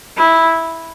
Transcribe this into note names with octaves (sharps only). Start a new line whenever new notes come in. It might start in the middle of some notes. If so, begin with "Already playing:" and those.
E4